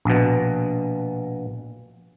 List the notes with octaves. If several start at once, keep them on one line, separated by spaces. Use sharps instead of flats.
A#1 B2